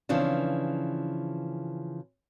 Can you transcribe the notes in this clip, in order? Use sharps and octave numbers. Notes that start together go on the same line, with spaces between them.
C#3 E3 F3 C4 D4